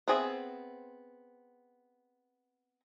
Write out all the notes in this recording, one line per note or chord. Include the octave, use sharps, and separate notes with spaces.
B3 C4 G#4 D5 E5